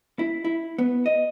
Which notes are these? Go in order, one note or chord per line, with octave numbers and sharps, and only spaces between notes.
E4
E4
B3
D#5